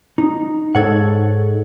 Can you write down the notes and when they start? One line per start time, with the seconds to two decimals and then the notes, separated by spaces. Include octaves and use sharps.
0.18 D#4
0.75 G#2 A4 C#5 F#5